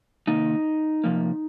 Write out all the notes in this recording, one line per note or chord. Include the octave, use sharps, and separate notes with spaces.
C3 D#3 A#3 D#4
C3 F3 A#3